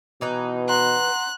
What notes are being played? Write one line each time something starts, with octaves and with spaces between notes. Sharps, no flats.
B2 E3 D#4 B4
F#5 A#5 C6 F#6